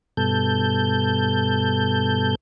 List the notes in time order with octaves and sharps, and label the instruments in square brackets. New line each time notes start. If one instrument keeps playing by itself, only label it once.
[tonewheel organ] G2 B2 A4 G6